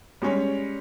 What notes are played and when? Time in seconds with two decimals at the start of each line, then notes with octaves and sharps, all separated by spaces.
0.22 G3 G#3 C#4 C#5